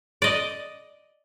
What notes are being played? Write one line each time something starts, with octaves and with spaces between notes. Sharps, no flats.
D5 D#5